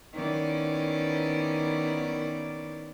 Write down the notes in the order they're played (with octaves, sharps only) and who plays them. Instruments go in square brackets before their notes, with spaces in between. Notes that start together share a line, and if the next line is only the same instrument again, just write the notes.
[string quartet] D#3 B3 C#4 E4 D5